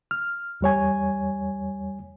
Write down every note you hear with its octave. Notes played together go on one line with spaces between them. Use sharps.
F6
E2 G3 C#5 G#5